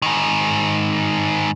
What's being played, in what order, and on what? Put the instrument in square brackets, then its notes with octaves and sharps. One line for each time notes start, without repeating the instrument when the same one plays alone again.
[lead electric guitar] G#2 D#3